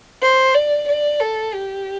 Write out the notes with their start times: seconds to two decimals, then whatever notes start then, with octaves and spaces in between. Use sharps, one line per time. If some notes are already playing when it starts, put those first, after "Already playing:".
0.22 C5
0.54 D5
0.88 D5
1.20 A4
1.54 G4